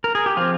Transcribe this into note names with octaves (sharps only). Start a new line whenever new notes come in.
A#4
G#4
G4
F3 C4 F4